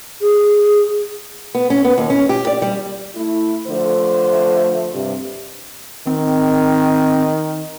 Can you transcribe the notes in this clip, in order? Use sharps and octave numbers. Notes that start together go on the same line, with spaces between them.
G#4
B3
C#4
B3
D#2
C#4
G4
D5
G3
A3 E4
D3 F3 A3 C5
G2 C3
D#3 C4